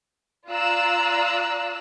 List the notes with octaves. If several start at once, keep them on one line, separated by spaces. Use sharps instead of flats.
F4 D5 F5 A#5 E6 F#6